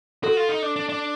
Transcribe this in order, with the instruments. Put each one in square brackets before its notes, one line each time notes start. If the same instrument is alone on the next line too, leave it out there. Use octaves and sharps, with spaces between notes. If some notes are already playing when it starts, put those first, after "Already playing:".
[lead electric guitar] F#4 [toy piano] A4
[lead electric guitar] F4
D#4
D4
D4
D4